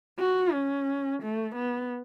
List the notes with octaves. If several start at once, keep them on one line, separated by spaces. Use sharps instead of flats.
F#4
C#4
A3
B3